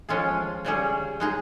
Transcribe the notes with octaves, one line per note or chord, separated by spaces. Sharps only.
F3 G#3 C#4 F4 G#4
C#3 G3 C#4 G#4
G#3 D#4 G#4